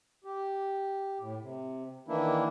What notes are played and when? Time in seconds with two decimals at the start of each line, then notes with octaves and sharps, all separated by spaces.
0.24 G4
1.20 A2
1.41 C3
2.08 D#3 E3 A#3 D4 E4